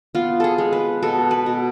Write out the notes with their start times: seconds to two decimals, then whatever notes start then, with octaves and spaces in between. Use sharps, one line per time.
0.15 B3 F4
0.40 G#4 A4
0.58 G#3
0.73 B4
1.02 B2 A4
1.31 B4
1.46 B2